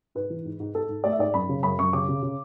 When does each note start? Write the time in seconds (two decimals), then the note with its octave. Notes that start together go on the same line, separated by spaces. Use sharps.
0.15 G#2 B4
0.30 E3
0.45 G#2
0.60 G#2
0.75 G#2 A4
0.89 G#2
1.04 A3 D5
1.13 E5
1.19 G#2 D5
1.34 F#2 B5
1.49 C#3
1.63 F#2 B5
1.79 F#2 C#6
1.93 C#3 D6
2.08 C#3
2.22 C#3